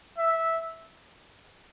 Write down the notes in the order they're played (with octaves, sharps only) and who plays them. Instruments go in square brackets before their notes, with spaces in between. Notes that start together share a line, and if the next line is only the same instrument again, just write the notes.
[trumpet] E5